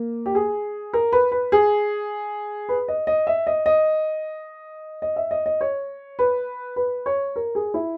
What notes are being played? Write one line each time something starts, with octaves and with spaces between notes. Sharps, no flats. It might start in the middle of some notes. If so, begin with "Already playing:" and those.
Already playing: A#3
G4
G#4
A#4
B4
B4
G#4
B4
D#5
D#5
E5
D#5
D#5
D#5
E5
D#5
D#5
C#5
B4
B4
C#5
A#4
G#4
E4